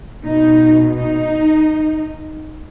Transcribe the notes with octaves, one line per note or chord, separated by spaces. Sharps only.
B2 D#4
D#4